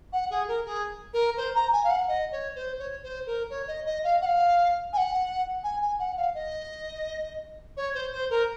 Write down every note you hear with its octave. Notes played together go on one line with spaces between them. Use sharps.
F#5
G#4
A#4
G#4
A#4
C5
A#5
G#5
F5
F#5
D#5
C#5
C5
C#5
C5
A#4
C#5
D#5
D#5
F5
F#5
F5
G#5
F#5
G#5
G#5
F#5
F5
D#5
C#5
C5
C5
A#4